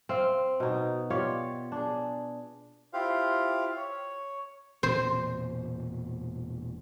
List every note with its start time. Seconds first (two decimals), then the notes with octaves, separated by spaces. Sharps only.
0.09 C4 F5
0.60 B2 D#4
1.10 F4 G4 C#5 D5
1.72 D4 G#4
2.93 E4 F4 G4 C5 F5
3.77 C#5
4.83 E1 A#2 C4 C5